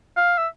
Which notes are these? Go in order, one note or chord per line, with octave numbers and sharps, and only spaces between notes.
F5
E5